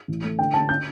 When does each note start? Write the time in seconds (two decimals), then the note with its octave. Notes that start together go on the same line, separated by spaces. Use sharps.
0.08 A1
0.23 A3
0.39 D3 G5
0.54 D3 A5
0.69 G6